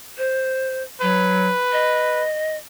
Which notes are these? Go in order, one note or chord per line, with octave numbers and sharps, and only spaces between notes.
C5
F#3 B4
D#5